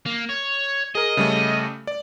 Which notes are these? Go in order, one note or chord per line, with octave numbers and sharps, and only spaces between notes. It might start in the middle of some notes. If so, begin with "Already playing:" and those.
A#3
C#5
G#4 A#4 D#5
C#3 G3 A3
D5